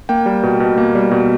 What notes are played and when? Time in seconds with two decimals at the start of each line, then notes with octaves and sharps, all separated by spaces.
0.09 A#3 G5
0.26 G3
0.43 B2
0.60 B2
0.78 A#3
0.95 G3
1.11 B2